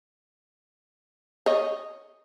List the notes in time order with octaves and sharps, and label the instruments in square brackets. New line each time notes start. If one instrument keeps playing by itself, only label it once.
[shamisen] C#5 D#5